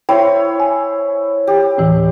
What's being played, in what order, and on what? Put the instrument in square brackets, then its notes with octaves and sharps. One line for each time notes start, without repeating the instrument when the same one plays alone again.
[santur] E4 C5 C#5 [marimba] G5
[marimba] G#5
[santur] G4
[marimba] D2 A2 E3